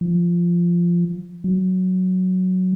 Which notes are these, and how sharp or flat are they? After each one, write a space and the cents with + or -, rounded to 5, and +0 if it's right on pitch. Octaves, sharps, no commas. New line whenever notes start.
F3 -10
F#3 +0